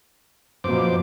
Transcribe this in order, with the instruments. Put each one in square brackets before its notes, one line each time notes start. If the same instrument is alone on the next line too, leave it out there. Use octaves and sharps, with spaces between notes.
[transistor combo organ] F#2 C5 D6 [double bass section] B2 F3 A#3